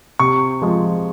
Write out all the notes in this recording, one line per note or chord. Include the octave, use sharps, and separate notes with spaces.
C3 C#6
F3 G#3